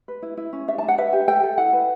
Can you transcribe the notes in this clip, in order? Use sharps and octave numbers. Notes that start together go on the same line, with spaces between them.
B4
E4
E4
C#4
D4 E5
A5
D4
F#5
B4 E5
G4
A4 G5
A4
E4 F#5
B4